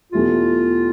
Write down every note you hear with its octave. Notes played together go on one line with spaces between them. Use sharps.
E2 B2 A3 E4 F4 G4